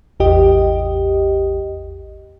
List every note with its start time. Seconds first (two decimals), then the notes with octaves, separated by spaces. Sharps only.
0.20 A1 E2 G4 D#5